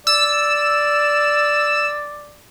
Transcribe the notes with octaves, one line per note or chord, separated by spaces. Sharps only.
D5 E6